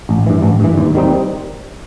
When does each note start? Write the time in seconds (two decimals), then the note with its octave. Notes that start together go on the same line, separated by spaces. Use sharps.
0.09 A1
0.27 G2 E3
0.42 A1
0.60 G2 E3
0.78 D#2
0.95 D#3 G3 C4 D#4